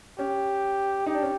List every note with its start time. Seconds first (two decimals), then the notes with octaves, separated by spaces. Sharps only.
0.18 C#4 G4
1.06 D#4 G4
1.14 D4
1.22 C#4